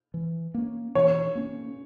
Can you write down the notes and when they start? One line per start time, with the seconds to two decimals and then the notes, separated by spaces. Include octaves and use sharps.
0.14 E3
0.54 A#3 C#4
0.95 E3 C#5
1.35 A#3 C#4